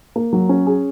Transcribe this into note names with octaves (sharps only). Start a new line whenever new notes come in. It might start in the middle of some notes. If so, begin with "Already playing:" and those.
A#3
F#3
C#4
G#4